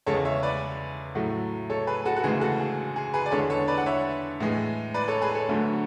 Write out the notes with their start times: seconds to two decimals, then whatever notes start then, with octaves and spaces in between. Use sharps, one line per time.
0.06 E2 C#3 G#3 A4 C#5
0.25 C#5 E5
0.43 B4 D5
1.15 A2 F#3 A3
1.70 A4 C#5
1.87 G#4 B4
2.05 F#4 A4
2.16 F#4
2.24 D2 C#3 E3 G#3 G#4
2.41 F#4 A4
2.60 G#4
2.96 G#4
3.14 G#4 B4
3.26 D5
3.31 E2 D3 G#3 A4 C#5
3.50 A4 C#5
3.68 B4 D5
3.78 F#5
3.86 C#5 E5
4.40 A2 E3 G#3
4.94 B4 D5
5.08 A4 C#5
5.21 G#4 B4
5.35 A4 C#5
5.49 D2 D3 F#3 A3